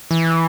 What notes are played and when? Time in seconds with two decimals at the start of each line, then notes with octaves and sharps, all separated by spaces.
0.11 E3